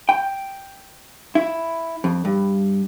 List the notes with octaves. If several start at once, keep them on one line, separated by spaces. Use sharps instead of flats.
G5
E4
F2
G2